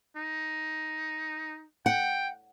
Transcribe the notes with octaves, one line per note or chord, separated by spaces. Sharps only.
D#4
F#5 G5